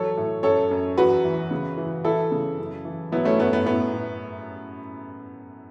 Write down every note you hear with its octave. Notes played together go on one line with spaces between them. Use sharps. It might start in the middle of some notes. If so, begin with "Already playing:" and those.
Already playing: E3 F#3 A4 C#5
A2
F#2 A4 C#5
F#2
E2 F#4 B4
E3
C#3
E3
E3 E4 A4
C#3
F#2
E3
F#3 B3 E4
A3 C#4
F#2 B3
B3
A2 B3
A2